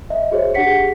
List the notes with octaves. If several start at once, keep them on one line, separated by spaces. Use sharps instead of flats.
D#5 E5
F#4 G#4 C5 C#5 E5
D4 G4 G#4 F#5 B6 C#7